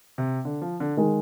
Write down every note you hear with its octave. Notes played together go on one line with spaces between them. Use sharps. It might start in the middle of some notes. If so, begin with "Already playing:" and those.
C3
D3
F3
D3
D#3 G#3 D#4